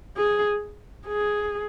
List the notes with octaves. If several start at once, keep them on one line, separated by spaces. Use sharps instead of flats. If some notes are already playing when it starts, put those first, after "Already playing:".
G#4
G#4